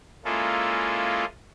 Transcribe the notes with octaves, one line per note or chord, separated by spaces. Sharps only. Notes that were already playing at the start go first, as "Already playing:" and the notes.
G#3 A#3 C#4 E4 F4 A4